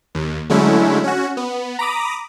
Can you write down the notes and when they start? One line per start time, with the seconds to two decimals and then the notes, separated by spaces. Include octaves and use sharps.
0.15 D#2
0.50 D3 F#3 G#3 A3 C#4 E4
1.04 C#4 F#4
1.37 B3
1.79 A#5 B5 D6 D#6